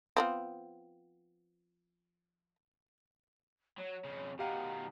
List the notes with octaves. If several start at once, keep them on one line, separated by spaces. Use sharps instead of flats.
F3 B3 C4
F#3 C#5
F2 C#3
B2 D#3 G4 F5 F#5 A#5